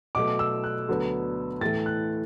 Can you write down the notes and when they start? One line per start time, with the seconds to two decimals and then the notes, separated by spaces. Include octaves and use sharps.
0.15 B2 F#3 A3 D6
0.39 E6
0.64 F#6
0.88 D2 D3 F#3 B3
1.61 A2 E3 A3 A6
1.86 F#6